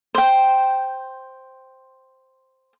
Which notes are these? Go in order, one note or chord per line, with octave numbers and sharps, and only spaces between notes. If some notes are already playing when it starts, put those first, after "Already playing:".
C5 G5